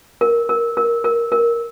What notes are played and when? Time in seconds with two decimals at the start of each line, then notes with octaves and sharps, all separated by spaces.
0.21 A#4
0.49 A#4
0.77 A#4
1.04 A#4
1.32 A#4